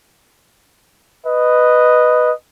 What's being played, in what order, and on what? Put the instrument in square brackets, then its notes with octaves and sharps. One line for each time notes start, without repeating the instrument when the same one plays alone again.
[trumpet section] B4 D#5